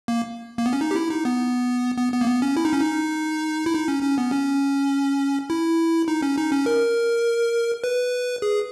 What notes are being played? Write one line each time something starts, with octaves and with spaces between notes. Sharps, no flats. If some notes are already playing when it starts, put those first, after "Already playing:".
A#3
A#3
B3
C#4
D#4
G4
E4
D#4
B3
B3
B3
A#3
B3
C#4
E4
D#4
C#4
D#4
E4
D#4
C#4
C#4
B3
C#4
E4
D#4
C#4
D#4
C#4
A#4
B4
G#4